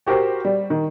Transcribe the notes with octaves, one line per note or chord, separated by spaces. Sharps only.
F#4 G4 A#4 C5 G5
G3
D#3